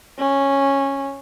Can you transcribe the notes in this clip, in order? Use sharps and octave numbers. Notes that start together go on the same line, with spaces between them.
C#4